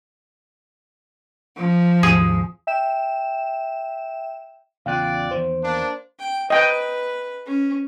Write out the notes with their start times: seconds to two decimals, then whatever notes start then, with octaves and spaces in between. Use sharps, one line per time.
1.57 F3
2.03 G#1 D#2 G#4
2.67 E5 G5 E7
4.86 E2 C#3 E3 F4 D5 F5 G5 F#6
5.31 E2 D#3 C5
5.63 A#3 D4
6.19 G5
6.50 B4 D#5 G5
7.46 C#4